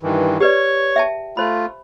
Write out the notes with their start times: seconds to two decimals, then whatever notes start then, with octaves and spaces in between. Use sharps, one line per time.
0.03 G2 D#3 E3
0.40 G4 B4 C#5 D5 C#6
0.96 E5 G5 A5
1.37 A3 F4 C5 B5